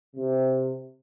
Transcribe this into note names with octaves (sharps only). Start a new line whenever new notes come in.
C3